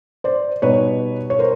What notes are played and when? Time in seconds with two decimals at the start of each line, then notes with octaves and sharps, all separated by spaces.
0.24 C5 D5
0.62 B2 G3 B3 D#4 B4 C#5
1.30 C#5
1.39 A#4 C5